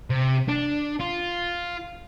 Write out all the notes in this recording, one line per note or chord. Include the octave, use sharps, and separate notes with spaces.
C3
D4
F4